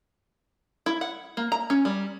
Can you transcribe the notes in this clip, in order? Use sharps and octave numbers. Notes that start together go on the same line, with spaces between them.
E4
F#5
A#3
A#5
C#4
G3